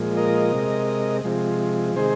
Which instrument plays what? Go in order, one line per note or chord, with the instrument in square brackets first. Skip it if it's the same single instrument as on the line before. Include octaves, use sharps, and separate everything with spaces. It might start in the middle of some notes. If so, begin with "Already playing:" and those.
Already playing: [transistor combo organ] A#2 F3 G#3
A#4 D#5
C3 G#3
C3 F3 G#3
C3 D#3 G#3 G#4 C5